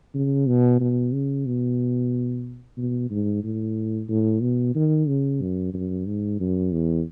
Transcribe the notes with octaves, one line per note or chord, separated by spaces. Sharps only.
C#3
B2
B2
C#3
B2
B2
G#2
A2
A2
B2
D#3
C#3
F#2
F#2
G#2
F#2
E2